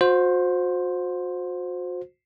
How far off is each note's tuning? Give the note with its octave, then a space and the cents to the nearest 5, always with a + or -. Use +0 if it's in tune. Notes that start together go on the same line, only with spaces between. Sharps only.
F#4 -40 C5 +0